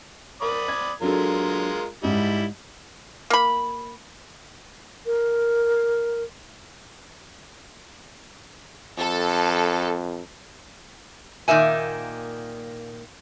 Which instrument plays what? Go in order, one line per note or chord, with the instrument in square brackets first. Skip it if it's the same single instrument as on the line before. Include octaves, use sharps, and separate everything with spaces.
[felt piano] A#4 [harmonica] D5 B5 D#6
[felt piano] G#6
[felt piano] F#3 D4 A4 [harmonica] G#3 F4 A#4
[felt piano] G#2 G#3 [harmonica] G3 E4
[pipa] A#3 B5
[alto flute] A#4
[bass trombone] F2 [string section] A4
[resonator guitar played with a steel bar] A#2 D#3 A#3 E5 G#5